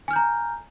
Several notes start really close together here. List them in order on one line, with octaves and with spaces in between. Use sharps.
G#5 F6 G6 A#5